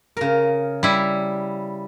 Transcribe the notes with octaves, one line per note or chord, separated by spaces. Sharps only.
C#3 A#4
G3 E4